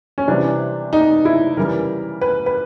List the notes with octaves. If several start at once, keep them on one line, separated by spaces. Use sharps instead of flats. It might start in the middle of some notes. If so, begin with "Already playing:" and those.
C#4
C3 E3 G3 D4
D#4
E4
C#3 E3 G3 A#4
B4
B4